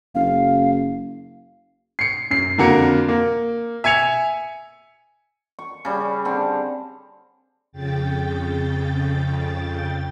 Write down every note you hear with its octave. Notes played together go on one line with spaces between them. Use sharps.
F#1 F5
C7 C#7
F#2 C7
F2 D3 A#3 F#4 A#4 C#7
A#3
E5 G#5 G#6 C#7 F7
C#6
C#3 G3
D3 C4
F2 C#3 G5 A6